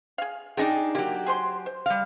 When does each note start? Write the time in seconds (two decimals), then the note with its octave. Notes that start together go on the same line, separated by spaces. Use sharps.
0.18 G#4 F5
0.57 D4 D#4 G4 G#4 G5 A5
0.95 F#3 A#3 G4
1.26 G#4 C5 C6
1.66 C5
1.86 G3 F5